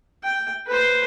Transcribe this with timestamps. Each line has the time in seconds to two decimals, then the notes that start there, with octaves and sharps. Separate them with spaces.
0.24 G5
0.67 B4 C5